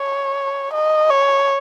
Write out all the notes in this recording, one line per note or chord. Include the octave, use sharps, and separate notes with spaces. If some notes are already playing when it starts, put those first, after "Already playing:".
Already playing: C#5
D#5
C#5